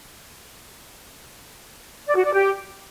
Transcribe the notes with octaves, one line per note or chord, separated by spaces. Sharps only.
D5
F#4
D5
G4